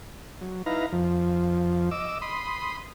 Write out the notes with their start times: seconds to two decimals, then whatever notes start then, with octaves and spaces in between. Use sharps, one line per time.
0.41 F#3
0.66 D#4 E4 B4 F5 A#5
0.92 F2 F3
1.91 D#5 D6 E6
2.22 B5 C6 D#6